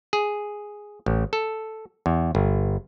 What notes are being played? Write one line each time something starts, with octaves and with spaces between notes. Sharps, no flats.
G#4
A1
A4
E2
G1